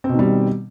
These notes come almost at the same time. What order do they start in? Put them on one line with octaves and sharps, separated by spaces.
C4 B2 D#3 G3